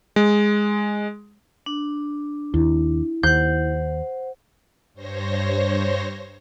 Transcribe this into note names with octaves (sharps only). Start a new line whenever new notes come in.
G#3
D4
D#2 E4
D#2 C5 F#5 G6
G2 C5 C#5 A#6